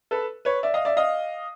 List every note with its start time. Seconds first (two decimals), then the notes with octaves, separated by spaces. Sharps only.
0.11 A4 B4
0.45 B4 C#5
0.63 D5 E5
0.74 D#5 F5
0.85 D5 E5
0.97 D#5 F5